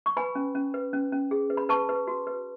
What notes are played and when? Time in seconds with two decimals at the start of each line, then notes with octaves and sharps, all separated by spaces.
0.06 C#6
0.17 B4 G#5 B5
0.35 C#4
0.55 C#4
0.74 B4
0.93 C#4
1.12 C#4
1.31 G#4
1.50 B4
1.57 B5
1.69 B4 A5 C#6
1.89 B4
2.08 F#4
2.27 B4